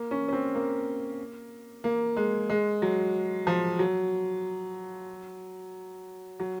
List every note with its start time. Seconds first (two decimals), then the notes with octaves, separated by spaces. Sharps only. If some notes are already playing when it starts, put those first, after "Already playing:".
Already playing: A#3
0.11 C#4
0.28 C#4
0.33 C4
0.55 A#3
1.84 A#3
2.17 G#3
2.50 G#3
2.82 F#3
3.47 F3
3.79 F#3
6.40 F#3